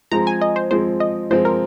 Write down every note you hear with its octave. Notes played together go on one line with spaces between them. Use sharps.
F3 G#3 C4 A#5
G#5
D#5
C5
F3 G#3 C4 C5
D#5
F3 G#3 C4 C5
A#4